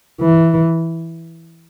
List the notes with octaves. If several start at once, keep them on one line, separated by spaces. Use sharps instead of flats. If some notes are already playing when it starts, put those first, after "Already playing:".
E3